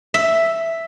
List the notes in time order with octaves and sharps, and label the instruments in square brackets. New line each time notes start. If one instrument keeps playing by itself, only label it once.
[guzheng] E5